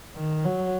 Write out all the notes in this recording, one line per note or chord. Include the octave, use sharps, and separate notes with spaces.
D#3
F#3